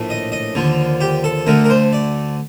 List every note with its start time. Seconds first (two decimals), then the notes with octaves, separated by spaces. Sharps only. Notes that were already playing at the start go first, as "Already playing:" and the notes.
Already playing: A#1 A2 A3
0.10 D#5
0.32 D#5
0.55 D#2 D3 F3
1.01 G4
1.24 A4
1.47 D2 D3 A3 A#4
1.64 A#4
1.70 C5
1.93 D5